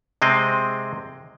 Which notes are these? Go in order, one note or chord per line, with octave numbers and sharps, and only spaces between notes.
C3 G#3 C4 D#5